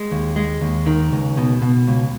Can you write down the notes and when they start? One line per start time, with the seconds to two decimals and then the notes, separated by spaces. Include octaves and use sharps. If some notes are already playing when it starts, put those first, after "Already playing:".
Already playing: G#3
0.11 D#2
0.36 G#3
0.61 D#2
0.86 D#3
1.12 C#2
1.37 B2
1.62 B2
1.87 C#2